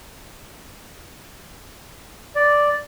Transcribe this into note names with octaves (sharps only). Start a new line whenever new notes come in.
D5